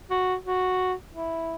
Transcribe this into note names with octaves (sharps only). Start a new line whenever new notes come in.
F#4
F#4
E4